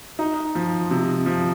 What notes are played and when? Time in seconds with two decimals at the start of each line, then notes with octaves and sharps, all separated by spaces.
0.19 D#4
0.55 F3
0.91 C3
1.26 F3